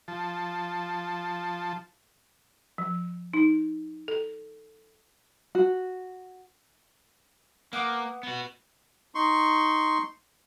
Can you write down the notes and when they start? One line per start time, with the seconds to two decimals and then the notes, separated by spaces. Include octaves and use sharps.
0.08 F3 A5
2.78 F3
3.34 D#4
4.08 A4
5.55 F#4
7.73 A#3 B3 F#5 D6
8.23 B3 F#4
9.15 D#4 C6 C#6